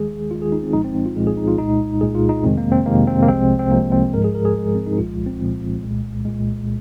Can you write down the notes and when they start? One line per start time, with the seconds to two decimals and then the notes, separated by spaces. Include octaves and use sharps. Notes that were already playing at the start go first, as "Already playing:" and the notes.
Already playing: D#2 D#3 G#3 G#4
0.31 D#2 D#3 G#3 F4
0.42 G#4
0.52 D#4
0.63 C4
0.73 C2 A#2 F3 G#3 D#4
0.84 C4
0.95 C4
1.06 F4
1.16 C2 A#2 F3 G#3 G#4
1.27 G#4
1.37 D#4
1.48 F4
1.58 C2 A#2 G#3 D#4
2.01 C2 A#2 G#3 G#4
2.15 F4
2.29 D#4
2.44 F2 C3 D#3 G#3 C4
2.58 A#3
2.72 C4
2.86 F2 C3 D#3 G#3 A#3
3.07 C4
3.22 A#3
3.28 C2 C3 F3 G#3 C4
3.59 C4
3.71 C2 C3 F3 G#3 A#3
3.92 C4
4.13 G#2 F3 G#3 A#4
4.24 G#4
4.35 A#4
4.45 G#4
4.56 G#2 F3 G#3
4.75 C4
4.86 D#4
4.98 C2 A#2 F3 G#3 F4
5.26 C4
5.41 C2 A#2 F3 G#3
5.83 C2 A#2 G#3
6.25 C2 A#2 G#3